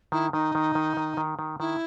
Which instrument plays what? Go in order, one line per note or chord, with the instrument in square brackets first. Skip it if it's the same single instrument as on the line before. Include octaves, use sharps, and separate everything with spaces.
[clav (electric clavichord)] D#3 [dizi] E4
[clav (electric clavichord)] D#3 [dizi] D#4
[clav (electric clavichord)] D#3
D#3
D#3
D#3
D#3
[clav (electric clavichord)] D#3 [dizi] E4